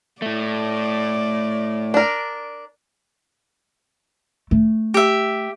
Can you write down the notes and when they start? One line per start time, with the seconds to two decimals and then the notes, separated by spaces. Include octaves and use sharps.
0.22 A2 A3 D5
1.94 D4 A#4
4.51 A3
4.94 G4 E5